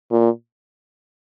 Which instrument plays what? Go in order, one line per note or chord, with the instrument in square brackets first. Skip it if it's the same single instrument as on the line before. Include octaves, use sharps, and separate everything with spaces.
[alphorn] A#2